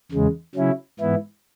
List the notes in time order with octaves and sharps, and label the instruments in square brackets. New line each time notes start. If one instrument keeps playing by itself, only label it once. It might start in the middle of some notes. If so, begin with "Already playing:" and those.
[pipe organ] E2 C#3 G#3
C#3 F#3 C#4 E4
G#2 E3 B3 E4